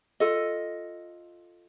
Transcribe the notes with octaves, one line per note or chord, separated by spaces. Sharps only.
F4 A4 D#5